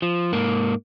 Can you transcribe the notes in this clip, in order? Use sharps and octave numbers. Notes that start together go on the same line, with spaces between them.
F3
G#2 A#3